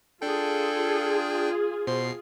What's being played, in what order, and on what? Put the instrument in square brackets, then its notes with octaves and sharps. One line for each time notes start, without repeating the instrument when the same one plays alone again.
[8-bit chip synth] D4 G5 [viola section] F4 G#4 [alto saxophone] A4
[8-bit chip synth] B2 C7 [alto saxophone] C5